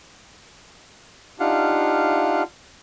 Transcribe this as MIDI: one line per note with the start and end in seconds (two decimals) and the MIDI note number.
1.40 2.43 62
1.40 2.43 63
1.40 2.42 65
1.40 2.43 67
1.40 2.42 77
1.40 2.42 78